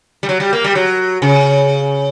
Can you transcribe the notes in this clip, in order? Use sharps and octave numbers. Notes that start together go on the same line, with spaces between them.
G3
F#3
G3
A#3
G3
F#3
C#3